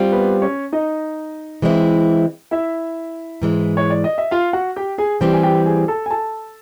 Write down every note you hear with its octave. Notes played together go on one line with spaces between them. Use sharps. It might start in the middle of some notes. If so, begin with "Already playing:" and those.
Already playing: G3 C4 F4
B3 B4
C#4 C#5
D#4 D#5
E3 G#3 C4 E4
E4 E5
G#2 E3 G#3
C#5
D5
D#5
E5
F4 F5
F#4 F#5
G4 G5
G#4 G#5
E3 G3 C4 G4 G5
G#5
G4 G5
G#4 G#5
A4 A5
G#5
A4 A5